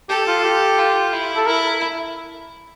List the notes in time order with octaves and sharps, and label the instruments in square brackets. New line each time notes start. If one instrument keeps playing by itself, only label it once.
[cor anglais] G4 [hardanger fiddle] A4
[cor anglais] F4
G4
[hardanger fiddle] F4
E4
[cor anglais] A4
[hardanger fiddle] E4 [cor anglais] A#4